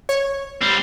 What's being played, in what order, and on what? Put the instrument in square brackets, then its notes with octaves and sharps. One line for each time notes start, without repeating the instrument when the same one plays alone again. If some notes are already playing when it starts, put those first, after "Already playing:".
[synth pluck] C#5
[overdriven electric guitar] G3 C4